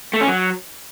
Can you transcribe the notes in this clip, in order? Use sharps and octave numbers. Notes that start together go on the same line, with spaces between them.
A3
C#4
F#3